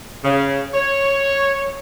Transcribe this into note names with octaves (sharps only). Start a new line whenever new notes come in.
C#3
C#5